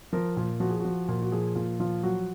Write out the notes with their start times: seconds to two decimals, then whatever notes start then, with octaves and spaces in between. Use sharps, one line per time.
0.13 F3 A#4
0.37 A#2 F4
0.60 F3 F#4
0.70 G#4
0.80 F3 F#4
1.08 A#2
1.22 F#4
1.32 F3 G#4
1.55 A#2 F4
1.80 F3 F4
2.03 F#3 F#4